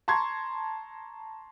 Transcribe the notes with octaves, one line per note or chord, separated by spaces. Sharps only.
A5 A#5 C6 C#6 G#6